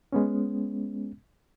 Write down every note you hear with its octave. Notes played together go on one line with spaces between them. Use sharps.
G#3 B3 C#4